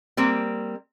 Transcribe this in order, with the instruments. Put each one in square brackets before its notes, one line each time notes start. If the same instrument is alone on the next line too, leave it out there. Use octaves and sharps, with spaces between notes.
[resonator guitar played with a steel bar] G3 A#3 C4